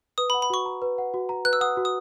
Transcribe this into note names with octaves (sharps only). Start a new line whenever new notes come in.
B4 D#6
B5
F#5
B5
F#4 C#6
A#5
B4
F#5
F#4
A#5
B4 F#6
E6
F#5 D#6
F#4
D#6